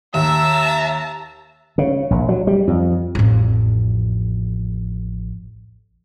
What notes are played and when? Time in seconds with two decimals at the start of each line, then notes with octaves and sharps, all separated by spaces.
0.14 D#2 E5 A5 A#5 E6
1.78 C#3
2.10 A#1
2.29 F#3
2.47 G3
2.68 F2
3.15 A1 F2